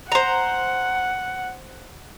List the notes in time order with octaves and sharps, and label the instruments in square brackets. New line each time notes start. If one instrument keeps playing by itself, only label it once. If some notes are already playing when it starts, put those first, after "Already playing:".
[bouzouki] C5 A#5 [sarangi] F#5